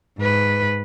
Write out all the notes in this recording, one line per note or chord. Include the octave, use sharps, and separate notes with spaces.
G#2 B4